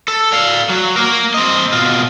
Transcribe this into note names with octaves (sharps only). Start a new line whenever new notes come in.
A4
D5 F5
F#3
A#3 A#4
C4 D#5
B2 F4